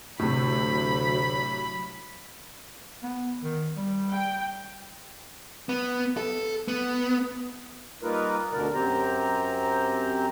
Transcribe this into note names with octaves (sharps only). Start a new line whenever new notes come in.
D2 A2 C3 F#3 B5
B3
D#3
G3
G5
B3
A4
B3
G3 A#3 D#4 F4 A#4 B4
D2 B2 D3 A#4 D5
F#2 C4 G4 C5 A#5